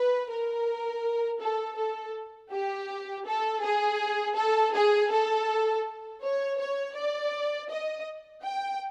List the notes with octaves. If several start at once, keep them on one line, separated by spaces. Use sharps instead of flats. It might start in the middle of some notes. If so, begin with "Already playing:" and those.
Already playing: B4
A#4
A4
A4
G4
A4
G#4
A4
G#4
A4
C#5
C#5
D5
D#5
G5